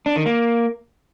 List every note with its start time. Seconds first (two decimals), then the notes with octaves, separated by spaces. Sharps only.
0.06 D4
0.16 D#3
0.26 A#3